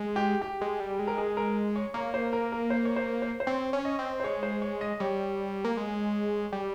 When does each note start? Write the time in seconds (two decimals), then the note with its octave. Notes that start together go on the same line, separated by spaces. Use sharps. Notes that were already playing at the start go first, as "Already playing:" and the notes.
Already playing: G#3
0.16 G4
0.42 G4
0.61 G#3
0.80 G3
0.99 G#3
1.07 A#4
1.18 G#4
1.37 A#4
1.76 C#5
1.94 A#3 C#5
2.14 C5
2.33 A#4
2.52 A#4
2.70 C5
2.85 C#5
2.96 C5
3.22 C5
3.40 C5
3.47 C4 C#5
3.73 C#4
3.85 D#5
3.99 C4
4.20 C5
4.24 G#3 C#5
4.43 C5
4.62 C#5
4.81 D#5
5.00 G3 C#5
5.64 A#3
5.77 G#3
6.52 G3